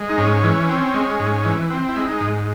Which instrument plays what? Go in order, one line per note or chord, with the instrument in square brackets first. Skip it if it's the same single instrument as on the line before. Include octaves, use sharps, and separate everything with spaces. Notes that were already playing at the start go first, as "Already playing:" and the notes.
Already playing: [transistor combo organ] G#3
D#4
G#2 C#4
E3
C4
G#3
G#2
E3
C4
E4
G#3
D#4
G#2